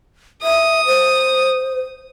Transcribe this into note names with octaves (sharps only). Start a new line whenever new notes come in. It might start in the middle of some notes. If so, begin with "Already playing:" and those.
E5 D#6
C5